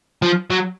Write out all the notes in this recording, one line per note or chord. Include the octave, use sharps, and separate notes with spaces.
F3
F#3